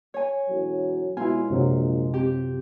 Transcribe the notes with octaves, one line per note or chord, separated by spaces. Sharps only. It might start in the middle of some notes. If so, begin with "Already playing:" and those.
C#5 G#5
E1 F#3
B2 G#3 E4 F4 G#5
A#1 F#2 C3 F#3
C4 G4